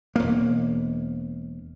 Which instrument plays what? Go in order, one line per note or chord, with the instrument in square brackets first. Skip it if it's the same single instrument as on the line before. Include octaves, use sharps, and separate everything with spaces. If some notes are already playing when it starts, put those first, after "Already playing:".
[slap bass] E1 A#3